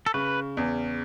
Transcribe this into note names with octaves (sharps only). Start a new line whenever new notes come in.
A4
C#3 B4
E2